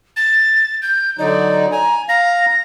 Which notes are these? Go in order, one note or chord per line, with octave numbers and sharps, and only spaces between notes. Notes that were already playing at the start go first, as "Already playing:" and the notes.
A6
G6
D3 F#3 D#4 D5
G#5 A#5
F5 A#5 A#6